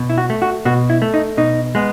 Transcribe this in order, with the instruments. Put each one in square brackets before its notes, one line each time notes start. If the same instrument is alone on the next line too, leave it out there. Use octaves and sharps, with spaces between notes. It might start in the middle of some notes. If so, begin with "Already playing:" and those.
Already playing: [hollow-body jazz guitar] B2
E4
F#4
A3
F#4
B2 F#4
E4
A3
D#4
B2 D#4
G#3 B3